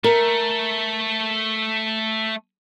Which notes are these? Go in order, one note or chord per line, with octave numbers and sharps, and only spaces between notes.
A3 A#4